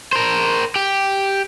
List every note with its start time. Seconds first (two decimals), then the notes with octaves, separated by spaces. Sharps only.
0.13 A#4 C5
0.76 G4